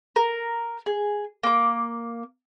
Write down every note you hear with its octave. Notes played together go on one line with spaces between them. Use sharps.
A#4
G#4
A#3 D6